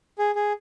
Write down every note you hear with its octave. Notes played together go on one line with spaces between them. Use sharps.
G#4
G#4